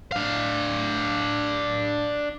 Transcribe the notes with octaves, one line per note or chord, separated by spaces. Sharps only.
D4 F5